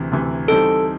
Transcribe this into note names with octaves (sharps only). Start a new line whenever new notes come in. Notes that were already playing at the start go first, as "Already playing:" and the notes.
Already playing: D2 C3 E3
D2 C3 E3
E3 G3 C4 D#4 A4